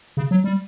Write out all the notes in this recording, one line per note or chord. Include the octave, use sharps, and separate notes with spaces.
C#3
F#3
G3